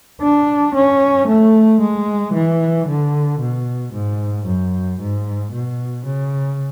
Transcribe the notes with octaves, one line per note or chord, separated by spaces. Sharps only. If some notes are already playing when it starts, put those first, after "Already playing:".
D4
C#4
A3
G#3
E3
D3
B2
G#2
F#2
G#2
B2
C#3